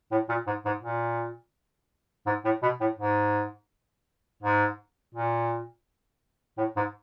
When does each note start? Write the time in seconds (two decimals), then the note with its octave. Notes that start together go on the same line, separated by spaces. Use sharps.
0.12 A2
0.29 A#2
0.47 G#2
0.65 G#2
0.83 A#2
2.26 G#2
2.45 A2
2.62 B2
2.81 A2
2.99 G#2
4.43 G#2
5.14 A#2
6.58 A2
6.76 G#2